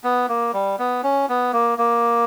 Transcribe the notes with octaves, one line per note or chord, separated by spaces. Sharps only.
B3
A#3
G3
B3
C#4
B3
A#3
A#3